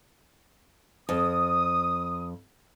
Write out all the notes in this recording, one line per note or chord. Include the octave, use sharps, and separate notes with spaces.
F2 D#6